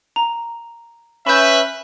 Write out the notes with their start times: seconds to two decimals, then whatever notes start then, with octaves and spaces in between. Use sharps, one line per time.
0.16 A#5
1.27 C#4 B4 E5 B5 G6